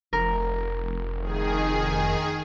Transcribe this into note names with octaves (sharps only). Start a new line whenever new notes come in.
F1 A#4
D#3 G#4